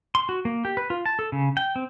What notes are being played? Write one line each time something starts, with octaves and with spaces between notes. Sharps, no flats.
C6
F#4
A#3
G4
B4
F4
A5
A4
C#3
G5
C4